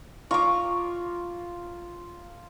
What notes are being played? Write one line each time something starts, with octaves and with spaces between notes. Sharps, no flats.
F4 A#5 C#6 D6